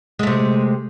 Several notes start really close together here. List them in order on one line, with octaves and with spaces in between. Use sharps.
G#3 A3 C3